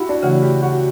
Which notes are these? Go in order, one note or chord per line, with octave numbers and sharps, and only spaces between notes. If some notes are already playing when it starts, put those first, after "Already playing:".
Already playing: E4 F#4 G4
D4
C#3 E3 A3 F#4
G4
F#4